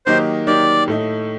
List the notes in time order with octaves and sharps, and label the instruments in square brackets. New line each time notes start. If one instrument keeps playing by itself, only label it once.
[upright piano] D#3 F#3 A#3 D#4 G4 [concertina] C5
[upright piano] D#3 F#3 A#3 D#4 G4 [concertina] D5
[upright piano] A2 A3 D#4